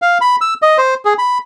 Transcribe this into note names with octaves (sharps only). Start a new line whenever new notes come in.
F5
B5
E6
D#5
C5
G#4
B5